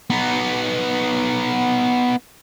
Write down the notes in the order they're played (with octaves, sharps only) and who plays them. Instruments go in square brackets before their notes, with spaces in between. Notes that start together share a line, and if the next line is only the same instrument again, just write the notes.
[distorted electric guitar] B3 D#4